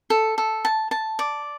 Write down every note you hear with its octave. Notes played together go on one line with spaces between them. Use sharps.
A4
A4
A5
A5
D5